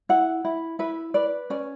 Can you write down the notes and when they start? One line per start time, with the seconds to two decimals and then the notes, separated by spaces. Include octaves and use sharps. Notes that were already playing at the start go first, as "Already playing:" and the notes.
0.09 E4 F#5
0.45 E4
0.79 E4 B4
1.14 B4 D5
1.50 C#4 D5